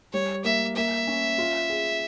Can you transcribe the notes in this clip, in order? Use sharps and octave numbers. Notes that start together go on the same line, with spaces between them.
G3 C#5
A#3 E5
A#3 E5
C#4
F4
G#4